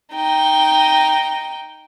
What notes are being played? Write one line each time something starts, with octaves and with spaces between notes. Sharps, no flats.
D#4 G5